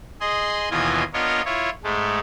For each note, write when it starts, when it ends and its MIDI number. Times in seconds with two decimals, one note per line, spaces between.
0.21 0.69 68
0.21 0.69 75
0.21 0.69 84
0.71 1.03 39
0.71 1.03 47
0.71 1.03 52
0.71 1.03 65
0.71 1.03 75
0.71 1.03 80
1.13 1.42 59
1.13 1.42 62
1.13 1.42 65
1.13 1.42 70
1.13 1.42 73
1.13 1.42 75
1.45 1.70 64
1.45 1.70 65
1.45 1.70 73
1.84 2.19 44
1.84 2.19 56
1.84 2.19 57